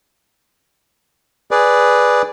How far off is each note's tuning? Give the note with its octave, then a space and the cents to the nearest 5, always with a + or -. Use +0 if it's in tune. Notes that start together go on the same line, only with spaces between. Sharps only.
G#4 +0 B4 +0 D5 +0